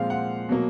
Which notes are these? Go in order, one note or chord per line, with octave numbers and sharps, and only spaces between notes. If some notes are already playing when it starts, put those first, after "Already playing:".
Already playing: A#2 F3 G#3 C4 F5
F#5
B2 F#3 A#3